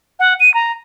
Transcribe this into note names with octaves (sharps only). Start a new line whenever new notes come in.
F#5
D#7
A#5